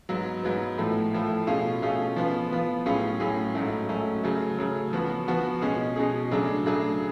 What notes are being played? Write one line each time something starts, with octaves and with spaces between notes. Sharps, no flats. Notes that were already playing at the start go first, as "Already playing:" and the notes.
G#2 F#3 B3
G#2 F#3 B3
A2 F3 A3
A2 F3 A3
B2 A3 C#4 F4 G#4
B2 A3 C#4 F4 G#4
F3 B3 F4
F3 B3 F4
A2 F#3 C#4 F4 G#4
A2 F#3 C#4 F4 G#4
G#2 F#3 A3 C#4
G#2 F#3 A3 C#4
C#3 F#3 A3
C#3 F#3 A3
F3 B3 F#4
F3 B3 F#4
B2 G#3 C#4 G#4
B2 G#3 C#4 G#4
C#3 F#3 A3 D4 G#4
C#3 F#3 A3 D4 G#4